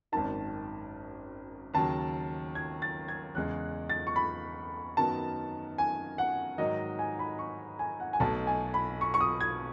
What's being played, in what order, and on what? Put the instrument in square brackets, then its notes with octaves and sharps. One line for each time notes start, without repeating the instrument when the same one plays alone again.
[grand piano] G#1 F#2 D#3 [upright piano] A5
[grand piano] D#2 C#3 F#3 [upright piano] A5
[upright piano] G#6
A6
G#6
[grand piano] E2 C#3 G#3 [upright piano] F#6
[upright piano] A6
C#6
B5
[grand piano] F#2 D#3 F#3 B3 D#4 [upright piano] A5
[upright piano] G#5
F#5
[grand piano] G#2 D#3 F#3 [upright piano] D#5
[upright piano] G#5
B5
C#6
G#5
F#5
G#5
[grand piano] B1 B2 A3 [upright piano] A5
[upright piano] G#5
B5
C#6
C#6
D#6
G#6